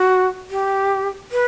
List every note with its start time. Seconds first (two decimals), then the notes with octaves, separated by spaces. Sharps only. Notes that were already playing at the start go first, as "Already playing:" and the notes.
Already playing: F#4
0.50 G4
1.32 B4